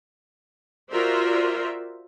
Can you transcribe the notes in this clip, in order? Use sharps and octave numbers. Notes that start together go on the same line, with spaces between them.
F4 F#4 A#4 C5 D5 E5